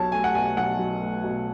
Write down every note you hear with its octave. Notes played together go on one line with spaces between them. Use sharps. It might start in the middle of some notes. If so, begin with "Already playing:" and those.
Already playing: B1 F#3 C#5 A5
A3 G#5
F#5
B2 G#5
B1 F#5
F#3
A3
B2